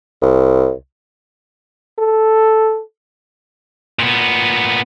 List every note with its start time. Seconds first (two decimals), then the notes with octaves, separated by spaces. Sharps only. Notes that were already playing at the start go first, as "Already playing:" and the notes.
0.22 C2
1.99 A4
3.99 A#2 B3